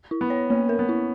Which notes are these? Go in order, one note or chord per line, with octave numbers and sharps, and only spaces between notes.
E4
B3
C#5
A#3 C#4
A#4
B3
E4